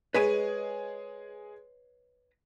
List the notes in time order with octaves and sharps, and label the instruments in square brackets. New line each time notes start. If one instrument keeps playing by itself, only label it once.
[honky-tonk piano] G#3 G#4 D#7 [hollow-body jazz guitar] B4 C#5 D#5